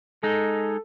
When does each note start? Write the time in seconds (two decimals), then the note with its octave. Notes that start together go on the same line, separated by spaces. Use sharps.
0.23 G#3 D#4 A4